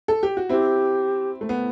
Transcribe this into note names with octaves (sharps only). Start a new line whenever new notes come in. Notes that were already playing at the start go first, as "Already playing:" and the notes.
A4
G4
F#4
C4 E4 G4
A3
B3